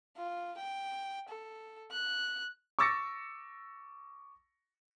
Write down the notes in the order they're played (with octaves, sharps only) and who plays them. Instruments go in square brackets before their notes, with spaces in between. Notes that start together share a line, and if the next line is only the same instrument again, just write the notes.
[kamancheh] F4
G5
A4
F#6
[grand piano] C#6 D6 E6 A6 A#6 C#7